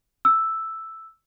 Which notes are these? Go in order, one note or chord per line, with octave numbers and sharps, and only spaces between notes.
E6